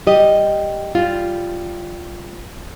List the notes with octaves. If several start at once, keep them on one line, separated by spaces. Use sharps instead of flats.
G3 G4 D#5
G3 F4